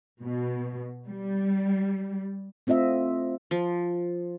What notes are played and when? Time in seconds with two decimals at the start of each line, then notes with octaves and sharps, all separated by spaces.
0.22 B2
1.09 G3
2.67 A3 C4 F4 D#5 E5
3.51 F3